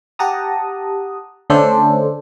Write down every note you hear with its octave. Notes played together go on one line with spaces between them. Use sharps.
G4 F#5 A5 A#5 D#6
D3 A3 C#4 D4 A4 C5